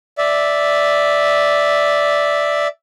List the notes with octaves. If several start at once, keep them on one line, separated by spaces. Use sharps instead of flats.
D5 E5